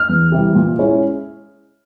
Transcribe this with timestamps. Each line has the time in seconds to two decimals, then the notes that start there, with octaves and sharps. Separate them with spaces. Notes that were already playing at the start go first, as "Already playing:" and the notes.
Already playing: F6
0.09 E2
0.32 C3 E3 G3
0.55 A#2
0.79 G#3 C#4 E4